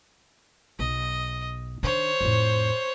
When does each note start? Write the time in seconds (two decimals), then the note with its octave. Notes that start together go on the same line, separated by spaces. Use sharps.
0.79 B1 D#5
1.83 D#3 D4 C5 C#5
2.21 F2 A2